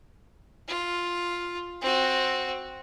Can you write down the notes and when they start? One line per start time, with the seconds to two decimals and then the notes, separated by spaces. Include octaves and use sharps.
0.68 F4
1.81 C4 F#4